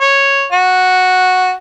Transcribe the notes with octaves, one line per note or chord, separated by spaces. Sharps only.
C#5
F#4